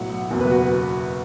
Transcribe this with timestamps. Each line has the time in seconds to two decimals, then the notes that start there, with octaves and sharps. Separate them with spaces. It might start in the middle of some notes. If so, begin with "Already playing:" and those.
Already playing: B1 A2 F#3 F#5
0.31 F#1 E2 B2 F#3
0.41 B4
0.51 F#4